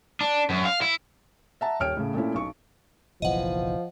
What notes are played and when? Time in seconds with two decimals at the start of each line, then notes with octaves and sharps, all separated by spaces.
0.21 D4
0.50 F#2
0.65 F5
0.82 E4
1.61 E5 F#5 A5 A#5
1.80 D#1 C#5 G5 F6 D7
1.97 A2 C#3
2.14 A#2 A3 C#4 E4
2.34 B1 C#6
3.22 F#1 B1 E3 F3 D#5 F#5